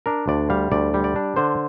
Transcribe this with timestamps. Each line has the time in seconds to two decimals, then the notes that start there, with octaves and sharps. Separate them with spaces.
0.06 D4 A#4
0.28 D2 D5
0.50 G3 F5
0.72 D2 D5
0.94 G3
1.04 D5
1.16 D4
1.36 D3 C5